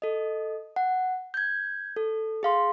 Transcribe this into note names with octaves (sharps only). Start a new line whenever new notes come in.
A4 D#5
F#5
G6 G#6
A4
G#4 F5 C6